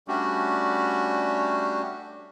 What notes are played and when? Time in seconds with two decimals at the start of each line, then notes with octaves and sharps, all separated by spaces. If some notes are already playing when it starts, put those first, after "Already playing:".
0.08 G3 A3 C#4 D4 F#4 G4